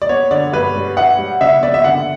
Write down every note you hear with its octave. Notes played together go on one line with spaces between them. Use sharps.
D5
B3 C#5
D3 D5
G2 B4
G3
E4 F#5
G3
C#3 E5
B3 D5
E5
D3 F#5